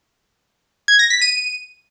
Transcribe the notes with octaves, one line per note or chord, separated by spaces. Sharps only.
G#6
A#6
B6
D#7